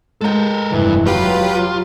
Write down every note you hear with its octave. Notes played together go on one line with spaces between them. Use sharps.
G#3 A4 A#4 G5
F1 G2 E3
F#3 F4 G4 B4